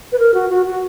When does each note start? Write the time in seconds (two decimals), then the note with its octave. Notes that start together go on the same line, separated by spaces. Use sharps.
0.12 B4
0.19 A#4
0.34 F#4
0.50 F#4
0.66 F#4